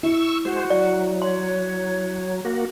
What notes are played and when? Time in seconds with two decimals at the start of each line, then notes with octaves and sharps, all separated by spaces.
0.03 E4 C#6 E6
0.45 G#3 F#4 C5
0.70 F#3 D5
1.22 C#5 C6
2.45 A#3 F#4